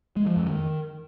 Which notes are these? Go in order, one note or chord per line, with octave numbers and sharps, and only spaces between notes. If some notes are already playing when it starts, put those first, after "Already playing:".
G#3
F3
F2
D#3